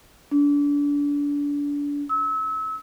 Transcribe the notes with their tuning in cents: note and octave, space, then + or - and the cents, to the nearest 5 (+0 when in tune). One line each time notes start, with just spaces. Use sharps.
D4 -30
E6 -30